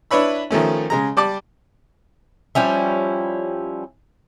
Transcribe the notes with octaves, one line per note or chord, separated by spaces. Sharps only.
D4 E4 B4 C#5 B5 E6
D#3 F3 A3 C#4
C#3 G#3 A#5
G3 D5 A5 D6
F3 G3 C#4 E4